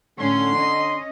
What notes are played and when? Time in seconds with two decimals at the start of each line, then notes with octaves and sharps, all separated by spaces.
0.18 A2 D3 C#4 C6
0.56 C#4 D#5